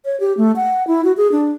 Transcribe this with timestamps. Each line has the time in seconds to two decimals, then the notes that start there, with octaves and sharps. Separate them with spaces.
0.05 C#5
0.20 G4
0.37 A3
0.56 F#5
0.87 E4
1.04 F#4
1.17 G#4
1.32 D4